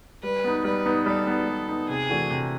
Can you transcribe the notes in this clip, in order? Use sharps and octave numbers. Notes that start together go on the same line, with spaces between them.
G3 B4
B3 D#4
G3 B4
B3 D#4
G3 A4
B3 D#4
G3
B3 D#4
C3 G#4
E3 A3 D4 F#4
C3